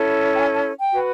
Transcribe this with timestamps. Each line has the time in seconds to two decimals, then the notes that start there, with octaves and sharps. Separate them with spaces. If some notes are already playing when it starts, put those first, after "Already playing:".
Already playing: C#4 E4 A4
0.35 G5
0.40 G#5
0.54 A5
0.79 G5
0.92 F#4 B4